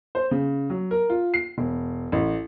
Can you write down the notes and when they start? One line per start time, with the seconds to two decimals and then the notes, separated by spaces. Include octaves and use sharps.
0.15 C5
0.31 C#3
0.70 F#3
0.91 A#4
1.10 F4
1.34 C7
1.58 E1
2.12 A1